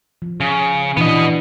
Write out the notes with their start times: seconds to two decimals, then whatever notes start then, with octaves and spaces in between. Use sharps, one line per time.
0.22 F3
0.40 C#3
0.97 A#2 E3 B3 D4 D#5